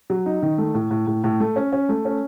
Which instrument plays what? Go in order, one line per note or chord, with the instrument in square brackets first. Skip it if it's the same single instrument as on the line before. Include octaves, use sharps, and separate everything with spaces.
[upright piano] F#3
D#4
D#3
A3
A2
A2
A2
A2
A3
C#4
C#4
A3
C#4